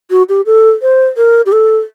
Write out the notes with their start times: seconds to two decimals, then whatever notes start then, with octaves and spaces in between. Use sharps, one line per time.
0.11 F#4
0.29 G4
0.46 A4
0.82 C5
1.17 A#4
1.46 G4
1.52 A4